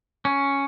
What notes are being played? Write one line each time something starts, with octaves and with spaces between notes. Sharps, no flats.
C#4